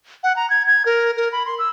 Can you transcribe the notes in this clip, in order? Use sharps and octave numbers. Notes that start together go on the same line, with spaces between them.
F#5
A#5
G#6
G#6
A#4
A#4
B5
C6
E6